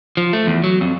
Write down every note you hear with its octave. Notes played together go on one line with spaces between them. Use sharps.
F3
A3
E2
F#3
F2